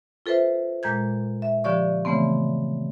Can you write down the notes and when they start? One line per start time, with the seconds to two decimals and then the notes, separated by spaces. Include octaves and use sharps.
0.26 F4 A4 B4 C5 E5
0.83 A#2 G#3 A#5 G6 G#6
1.42 E5
1.64 D3 F3 G4 D5 C#6
2.05 C#3 E3 A3 B3 C4